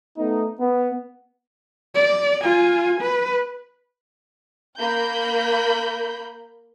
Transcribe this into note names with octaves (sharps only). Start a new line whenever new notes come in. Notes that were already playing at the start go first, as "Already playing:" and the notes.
A3 B3 D#4
B3
D5
F4 G#5
B4
A#3 A#4 B5 G6